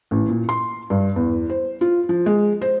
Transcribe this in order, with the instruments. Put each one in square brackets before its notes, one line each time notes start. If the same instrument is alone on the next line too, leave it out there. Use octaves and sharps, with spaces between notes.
[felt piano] A1
A#2
C6
G2
E2
C5
F4
F3
G#3
C5